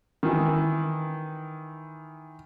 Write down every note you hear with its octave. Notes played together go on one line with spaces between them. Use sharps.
D#3 E3